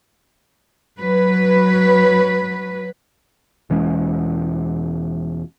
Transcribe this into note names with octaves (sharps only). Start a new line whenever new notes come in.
F#3 B4
E1 E3 G#3 C#4